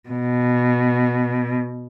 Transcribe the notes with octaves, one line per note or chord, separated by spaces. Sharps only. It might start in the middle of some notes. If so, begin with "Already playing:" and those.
B2